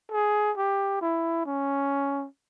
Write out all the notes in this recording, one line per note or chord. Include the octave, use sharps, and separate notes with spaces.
G#4
G4
E4
C#4